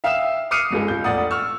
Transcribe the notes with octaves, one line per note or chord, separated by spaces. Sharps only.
E5 F5 G5 D#6 E6 E7
D6 D#6 F6 C7 C#7 D#7
G1 C#2 G#3
C#2 G6
F1 A#1 D5 F#5 D#6
C#6 E6 F6